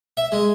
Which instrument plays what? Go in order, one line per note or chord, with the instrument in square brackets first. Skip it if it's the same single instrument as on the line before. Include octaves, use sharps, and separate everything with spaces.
[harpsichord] E5
G#3